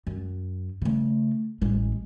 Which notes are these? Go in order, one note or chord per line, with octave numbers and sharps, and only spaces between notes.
F#2
C#3 A3
A1 G#3